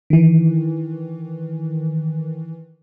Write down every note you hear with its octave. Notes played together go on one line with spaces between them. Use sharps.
D#3 E3